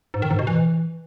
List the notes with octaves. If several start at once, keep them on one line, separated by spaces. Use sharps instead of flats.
G#2
D#3
G#2
B2
E3